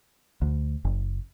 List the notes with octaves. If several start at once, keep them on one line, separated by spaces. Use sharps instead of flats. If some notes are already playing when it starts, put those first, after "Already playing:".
D2
F#1